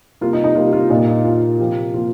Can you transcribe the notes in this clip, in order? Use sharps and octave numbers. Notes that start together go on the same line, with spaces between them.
C3 G3 A#3 F4
D#4
D#4
C3 G3 A#3 F4
F4
A#2 A#3 D#4
D#4
A#2 A#3 F4
C3 F3 A#3 G4
C3 F3 A#3 F4